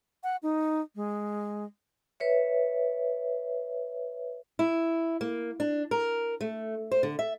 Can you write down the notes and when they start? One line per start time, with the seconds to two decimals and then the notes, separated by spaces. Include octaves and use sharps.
0.23 F#5
0.43 D#4
0.96 G#3
2.20 B4 C#5 E5
4.59 E4
5.21 A#3
5.60 D4
5.91 A#4
6.41 A3
6.91 C5
7.03 D3
7.19 E5